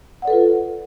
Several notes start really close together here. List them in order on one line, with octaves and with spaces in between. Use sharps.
F#5 D5 A4 B4 F4